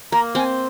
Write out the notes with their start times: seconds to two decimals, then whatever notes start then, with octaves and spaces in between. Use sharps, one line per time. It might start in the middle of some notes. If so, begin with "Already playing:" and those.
0.12 A#3 A#5
0.35 C4 G#5